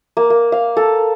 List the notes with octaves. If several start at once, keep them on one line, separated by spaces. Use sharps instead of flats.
A#3
A#3
F5
A4